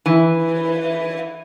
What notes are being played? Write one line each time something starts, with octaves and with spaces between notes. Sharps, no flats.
E3